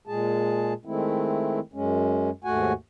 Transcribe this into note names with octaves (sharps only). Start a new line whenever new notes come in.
A#2 G#3 G#4 A5
D#3 G#3 A3 C4 E4
F#2 G#3 C#4
D#2 G#2 A3 F#4 F#5 G#5